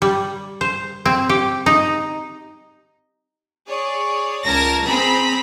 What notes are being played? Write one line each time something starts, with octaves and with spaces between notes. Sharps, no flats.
G3
C5
C4
G4
D#4
G#4 C#5 D5
C#2 A#4 A5 G#6 A#6
C4 G#4 C5 A#5 B5